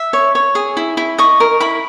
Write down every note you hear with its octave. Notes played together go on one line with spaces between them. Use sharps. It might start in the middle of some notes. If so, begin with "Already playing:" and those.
Already playing: E5
C#5
C#5
G#4
E4
E4
D#5 C#6
A#4
E4 B5